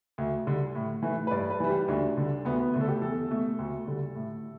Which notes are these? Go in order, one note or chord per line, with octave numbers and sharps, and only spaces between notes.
D2
D3 G3
A2
E3 A3
B4
G2 D5
B4
E3 G3
G4
D2 D4
D3 G3
D2 B3
B3
D3 A3
A4
G4
E2 A4
B2 A3
D2
D3 G3
A2